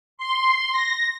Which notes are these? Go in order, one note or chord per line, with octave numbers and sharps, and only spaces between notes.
C6
A#6